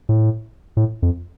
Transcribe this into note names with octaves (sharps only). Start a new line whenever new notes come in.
A2
A2
F2